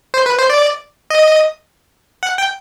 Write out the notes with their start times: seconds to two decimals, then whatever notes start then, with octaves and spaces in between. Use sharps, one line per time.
0.14 C5
0.26 B4
0.39 C5
0.50 D5
1.10 D#5
2.23 F#5
2.38 G5